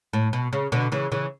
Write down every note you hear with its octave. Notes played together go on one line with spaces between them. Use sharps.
A2
B2
C#3
B2 D3
C#3 E3
C#3 E3